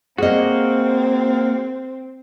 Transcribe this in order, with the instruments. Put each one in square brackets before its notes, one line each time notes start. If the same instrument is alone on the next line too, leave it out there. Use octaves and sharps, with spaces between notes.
[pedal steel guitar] A#3 F#4 [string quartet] C4 [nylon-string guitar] G#4 D#5